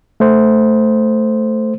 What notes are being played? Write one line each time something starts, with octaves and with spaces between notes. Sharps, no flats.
A3 C5